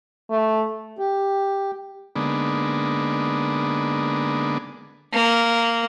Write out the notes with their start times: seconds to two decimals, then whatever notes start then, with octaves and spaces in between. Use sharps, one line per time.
0.31 A3
0.99 G4
2.16 D3 G#3 A#3 B3 D4 D#4
5.13 A#3